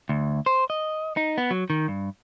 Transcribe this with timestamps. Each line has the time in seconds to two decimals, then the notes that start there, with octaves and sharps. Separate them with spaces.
0.09 D2
0.46 C5
0.70 D#5
1.17 D#4
1.38 B3
1.51 F#3
1.70 D#3
1.88 G2